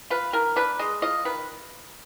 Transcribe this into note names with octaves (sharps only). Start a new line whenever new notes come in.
F4 B4
D#3 A#4
D4 B4
G#3 D#5
F4 D#5
D#3 B4